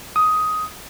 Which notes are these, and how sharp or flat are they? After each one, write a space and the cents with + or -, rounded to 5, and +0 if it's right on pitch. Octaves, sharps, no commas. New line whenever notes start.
D#6 +10